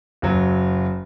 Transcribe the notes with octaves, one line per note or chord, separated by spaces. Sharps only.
F#1 F#3